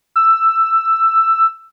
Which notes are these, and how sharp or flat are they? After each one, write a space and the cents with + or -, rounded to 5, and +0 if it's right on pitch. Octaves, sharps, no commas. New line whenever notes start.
E6 +10